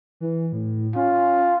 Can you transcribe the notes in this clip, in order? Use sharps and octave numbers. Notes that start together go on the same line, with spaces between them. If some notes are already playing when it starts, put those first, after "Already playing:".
E3
A2
C#4 F4